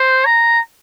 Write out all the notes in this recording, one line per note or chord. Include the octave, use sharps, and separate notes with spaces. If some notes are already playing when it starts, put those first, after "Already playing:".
Already playing: C5
A#5